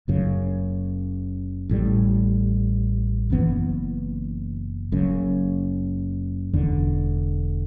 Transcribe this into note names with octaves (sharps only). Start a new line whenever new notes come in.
F#1 F#2 C#3
A1 A2 G3
F#1 F#2 E3 B3
F#1 F#2 C#3
E1 E2 D3